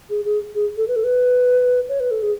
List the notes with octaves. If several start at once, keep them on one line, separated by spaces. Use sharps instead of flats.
G#4
G#4
G#4
A4
B4
A4
B4
C#5
B4
A4
G#4